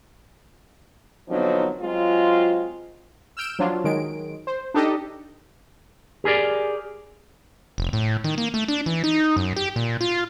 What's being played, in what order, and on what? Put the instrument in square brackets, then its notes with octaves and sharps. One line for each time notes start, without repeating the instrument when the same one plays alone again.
[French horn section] D3 F3 F#3 B3 C4 D#4
F#3 G#3 C4 F4
[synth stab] E6 F6 G6 D7 E7
F3 F#3 D4 F4
D#3 F#3 G#3 D7
C5
D4 D#4 G4 A4 D#5
[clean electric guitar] G4 G#4 A#4 D5
[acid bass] F1
A2
D#3
A#3
A3
D4
E3
D#4
F#2
G4
A#2
F4